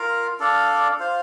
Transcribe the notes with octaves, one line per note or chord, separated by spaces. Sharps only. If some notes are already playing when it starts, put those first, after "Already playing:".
Already playing: F4 A#4 F5
D4 A4 D5 F5
F4 C5 F5